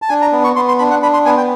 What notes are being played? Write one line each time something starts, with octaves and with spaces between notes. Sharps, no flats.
A5
D4 G#5
A#5
B3
C#6
B3 C6
C6
D4 B5
F#5
D4 B5
C6
B3 G#5
G5